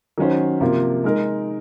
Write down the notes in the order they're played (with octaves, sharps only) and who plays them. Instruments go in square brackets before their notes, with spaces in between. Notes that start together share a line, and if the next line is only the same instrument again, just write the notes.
[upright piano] D#3 F#3 C#4 F#4 C5
C3 F3 A#3 F4
G#3 D#4 A#4